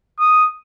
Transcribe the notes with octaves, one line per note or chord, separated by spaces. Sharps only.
D#6